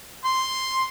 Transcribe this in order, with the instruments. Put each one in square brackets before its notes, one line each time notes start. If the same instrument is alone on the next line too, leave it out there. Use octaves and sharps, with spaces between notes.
[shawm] C6